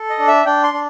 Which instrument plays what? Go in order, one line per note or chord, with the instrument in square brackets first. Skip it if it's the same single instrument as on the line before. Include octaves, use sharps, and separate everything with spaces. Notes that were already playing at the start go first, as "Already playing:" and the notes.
Already playing: [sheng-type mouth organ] A4
D#5
D4
E5
D4 G5
C6
D4